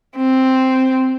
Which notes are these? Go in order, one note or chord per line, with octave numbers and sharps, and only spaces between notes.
C4